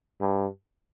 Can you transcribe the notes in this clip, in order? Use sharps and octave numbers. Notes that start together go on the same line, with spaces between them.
G2